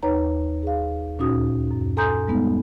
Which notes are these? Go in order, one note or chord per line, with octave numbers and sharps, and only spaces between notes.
D#2 D#4 B4 C#5 A#5
G#4 F5
D2 A#2 C#4 D#4 F#4 D#6
F#2
A4 G#5 A#5 C6 D#6 G6
G3 G#3 B3 D#4